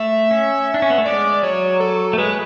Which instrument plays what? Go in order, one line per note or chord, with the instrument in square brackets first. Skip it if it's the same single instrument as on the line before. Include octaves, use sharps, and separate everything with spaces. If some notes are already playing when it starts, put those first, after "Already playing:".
Already playing: [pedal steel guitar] A3 [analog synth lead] E5
[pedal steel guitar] C#4
D4
C#4
B3
A3
[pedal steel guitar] G#3 [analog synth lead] D5
[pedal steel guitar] F#3 [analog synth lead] C#5
[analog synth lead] A4
[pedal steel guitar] A3
[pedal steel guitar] G#3 [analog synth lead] B4